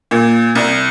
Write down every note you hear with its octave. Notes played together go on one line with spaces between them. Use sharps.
A#2
C2